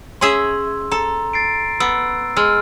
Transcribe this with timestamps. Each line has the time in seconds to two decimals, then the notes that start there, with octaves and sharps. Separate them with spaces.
0.21 C#4 G#4 E5 C6 E6
0.92 A4 A#5
1.33 A6 C7 D7
1.80 B3 E6
2.37 G#3 E6 F6